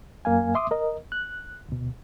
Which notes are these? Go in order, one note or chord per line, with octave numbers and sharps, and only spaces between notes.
F#2 A#3 F5 G#5
E5 C6 D6 D#6
A#4 D#5
F#6
D2 B2